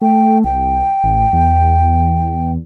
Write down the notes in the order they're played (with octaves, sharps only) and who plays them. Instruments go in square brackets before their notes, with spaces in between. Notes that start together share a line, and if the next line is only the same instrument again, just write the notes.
[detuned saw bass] A3 [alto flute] G5
[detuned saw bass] C2 [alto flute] G5
[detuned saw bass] A1
E2